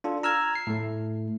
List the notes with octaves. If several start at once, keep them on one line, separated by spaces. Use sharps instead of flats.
D4 F4 A4
A#5 E6 F6 G#6
C7
A2 A3